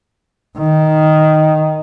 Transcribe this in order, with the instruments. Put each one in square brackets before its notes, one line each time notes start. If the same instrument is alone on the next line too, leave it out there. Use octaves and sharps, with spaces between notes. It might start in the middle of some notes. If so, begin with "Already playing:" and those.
[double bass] D#3